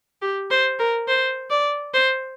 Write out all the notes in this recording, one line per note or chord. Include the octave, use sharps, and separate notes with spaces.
G4
C5
A#4
C5
D5
C5